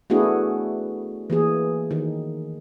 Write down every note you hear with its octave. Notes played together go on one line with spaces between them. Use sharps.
A3 B3 D4 E4 F#4 G#4
E3 A#3 G#4
D#3